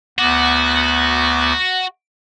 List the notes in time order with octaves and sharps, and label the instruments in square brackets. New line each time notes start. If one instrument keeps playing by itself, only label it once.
[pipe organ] D2 B3 D6 [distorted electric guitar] F#4